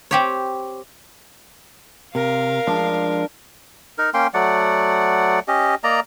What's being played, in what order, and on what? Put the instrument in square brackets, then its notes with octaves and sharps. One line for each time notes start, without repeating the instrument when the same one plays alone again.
[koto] C4 G4 C#5
[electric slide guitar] C3 [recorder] A#4 [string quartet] F5
[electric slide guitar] F3 G#3 [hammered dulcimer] D4
[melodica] D#4 A#4
A#3 C#4 G5 C6
F#3 A3 D5 F#5
C#4 G4 D#5
A#3 D5 D#5 A#5